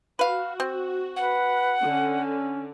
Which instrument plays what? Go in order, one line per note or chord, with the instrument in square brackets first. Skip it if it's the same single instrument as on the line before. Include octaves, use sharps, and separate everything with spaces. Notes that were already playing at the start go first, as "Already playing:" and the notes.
[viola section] F#4 [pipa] B4 F5
[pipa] C4
[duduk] B4 [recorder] F#5
[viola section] D3 [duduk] C#4